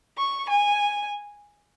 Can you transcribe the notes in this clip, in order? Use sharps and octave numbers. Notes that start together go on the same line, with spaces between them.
C#6
G#5